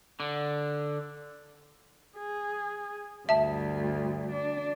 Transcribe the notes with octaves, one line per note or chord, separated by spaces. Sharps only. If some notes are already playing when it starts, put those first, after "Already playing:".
D3
G#4
D2 G2 E5 A5
D4